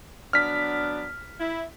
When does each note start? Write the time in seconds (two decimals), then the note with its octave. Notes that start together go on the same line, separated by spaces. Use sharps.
0.33 F#3 B3 D4 F6 B6
1.39 E4